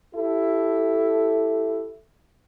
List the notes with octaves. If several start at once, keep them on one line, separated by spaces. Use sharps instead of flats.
E4 G4 A4